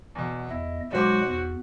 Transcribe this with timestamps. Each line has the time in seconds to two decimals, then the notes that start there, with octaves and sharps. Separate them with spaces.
0.15 E2 B2
0.50 E2 E4 D#5
0.92 B1 F#3 G#3 F#4 C5 D6
1.28 E2